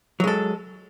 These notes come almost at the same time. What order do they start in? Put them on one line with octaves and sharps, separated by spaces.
F#3 G#3 A4